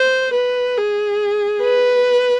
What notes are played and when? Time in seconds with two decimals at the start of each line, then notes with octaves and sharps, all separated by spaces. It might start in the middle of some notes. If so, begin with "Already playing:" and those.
Already playing: C5
0.34 B4
0.77 G#4
1.62 B4